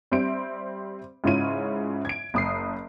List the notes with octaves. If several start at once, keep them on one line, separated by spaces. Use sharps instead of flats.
G3 C4 C5 E5 D7
G#2 C#3 E4 F4 C#5 D#7
G#6 D7
F#1 D#6 C7